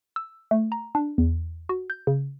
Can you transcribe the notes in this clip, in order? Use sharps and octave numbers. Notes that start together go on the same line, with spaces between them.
E6
A3
A#5
D4
E2
F#4
G6
C#3